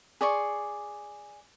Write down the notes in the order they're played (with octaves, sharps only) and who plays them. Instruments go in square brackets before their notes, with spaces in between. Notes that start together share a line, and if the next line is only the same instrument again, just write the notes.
[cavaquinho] G#4 D5 C6 C#6